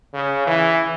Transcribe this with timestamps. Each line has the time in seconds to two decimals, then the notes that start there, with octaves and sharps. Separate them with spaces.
0.13 C#3
0.47 E3